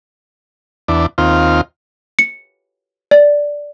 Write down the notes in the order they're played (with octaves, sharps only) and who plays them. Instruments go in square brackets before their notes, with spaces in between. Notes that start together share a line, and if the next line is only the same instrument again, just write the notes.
[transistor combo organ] E2 D4
D#2 C4 F4
[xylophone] C#7
D5